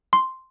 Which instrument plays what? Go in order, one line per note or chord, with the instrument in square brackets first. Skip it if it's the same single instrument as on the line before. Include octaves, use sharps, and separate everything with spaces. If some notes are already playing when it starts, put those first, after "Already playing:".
[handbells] C6